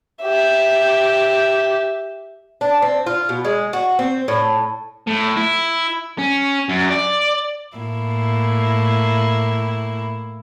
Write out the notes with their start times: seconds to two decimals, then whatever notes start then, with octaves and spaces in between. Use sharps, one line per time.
0.23 G4 E5
2.61 D4
2.82 C4
3.06 F4
3.29 B2
3.45 G#3
3.73 F#4
3.99 C4
4.28 A2
5.07 A2
5.36 E4
6.19 C#4
6.69 F#2
6.90 D5
7.77 A2 A#3 E4